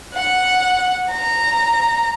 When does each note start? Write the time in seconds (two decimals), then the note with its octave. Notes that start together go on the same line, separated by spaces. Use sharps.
0.14 F#5
1.09 A#5